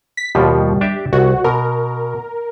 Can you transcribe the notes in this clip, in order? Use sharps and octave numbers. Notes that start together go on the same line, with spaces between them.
B6
D#2 B2 F3 G3
D4 G4 E5
C2 F#4
B2 A#4